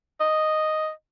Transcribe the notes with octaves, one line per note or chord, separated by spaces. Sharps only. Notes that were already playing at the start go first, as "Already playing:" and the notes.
D#5